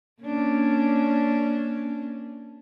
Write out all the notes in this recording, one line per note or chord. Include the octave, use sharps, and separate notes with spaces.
A#3 C#4 D4